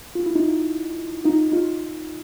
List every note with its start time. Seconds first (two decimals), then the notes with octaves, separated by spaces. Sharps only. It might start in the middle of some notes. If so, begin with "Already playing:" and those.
0.15 F4
0.26 E4
0.35 D#4 F4
1.25 D#4 F4
1.52 D#4 F4